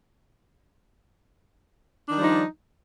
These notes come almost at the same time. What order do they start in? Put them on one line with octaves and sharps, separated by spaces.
D4 D#3 G3 F3 D#4